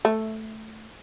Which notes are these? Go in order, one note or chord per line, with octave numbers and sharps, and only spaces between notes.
A3